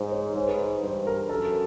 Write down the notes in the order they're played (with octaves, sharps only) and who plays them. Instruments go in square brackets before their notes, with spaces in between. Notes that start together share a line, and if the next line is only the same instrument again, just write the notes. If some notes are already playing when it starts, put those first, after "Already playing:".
Already playing: [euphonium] G#2 [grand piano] C5
[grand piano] C#5
[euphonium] G#2 [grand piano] C5
[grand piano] B4
C5
[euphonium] G2 [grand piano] C5
[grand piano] A#4
[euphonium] F#2 [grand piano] A4